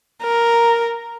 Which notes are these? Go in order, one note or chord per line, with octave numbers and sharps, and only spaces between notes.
A#4